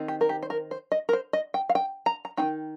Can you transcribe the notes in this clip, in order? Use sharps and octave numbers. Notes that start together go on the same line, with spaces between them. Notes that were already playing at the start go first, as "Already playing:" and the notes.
Already playing: D#3 C4 D#4
G4
A#4
G4
C5
A#4
C5
D#5
A#4
C5
D#5
G5
F5
G5
A#5
A#5
D#3 C4 D#4 G5